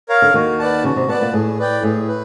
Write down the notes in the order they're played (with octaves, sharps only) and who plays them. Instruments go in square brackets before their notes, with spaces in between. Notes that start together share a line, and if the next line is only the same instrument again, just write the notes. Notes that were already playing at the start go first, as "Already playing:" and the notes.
[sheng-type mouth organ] A#4 C#5 F5
[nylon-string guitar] D3
[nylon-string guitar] D#2 D#3 [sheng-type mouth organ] F#4
[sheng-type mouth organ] B4 D5 F#5 A5
[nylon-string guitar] C#3 [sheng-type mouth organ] F#4
[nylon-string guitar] C3
[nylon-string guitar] B2 [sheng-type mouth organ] B4 D5 F#5 A5
[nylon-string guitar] A#2
[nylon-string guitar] A2 [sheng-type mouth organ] G#4
[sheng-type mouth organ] B4 D5 G5
[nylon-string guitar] A2 [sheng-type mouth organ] G#4
[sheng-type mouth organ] B4